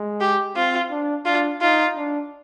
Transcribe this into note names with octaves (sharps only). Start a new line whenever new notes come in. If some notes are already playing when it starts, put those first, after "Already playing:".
Already playing: G#3
G4
C4 F4
D4
D4 F4
D#4 F4
D4